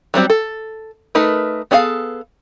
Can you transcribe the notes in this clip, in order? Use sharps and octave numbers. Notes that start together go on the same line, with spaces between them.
F#3 G3 C4 F#4
A4
A3 D#4 A#4 B4
B3 D4 G#4 A4 F5